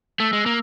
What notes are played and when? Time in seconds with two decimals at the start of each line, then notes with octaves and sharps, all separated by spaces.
0.20 A3 E6
0.33 G#3
0.46 A#3